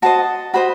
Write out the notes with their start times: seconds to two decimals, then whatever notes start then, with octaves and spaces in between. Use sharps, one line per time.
0.02 F#4 C5 D#5 A5
0.54 F#4 C5 D#5 B5